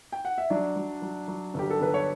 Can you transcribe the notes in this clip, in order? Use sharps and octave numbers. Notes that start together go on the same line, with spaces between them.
G5
F#5
E5
F#3 D4 D5
F#3
F#3
F#3
G1 G4
A4
G1 B4
C#5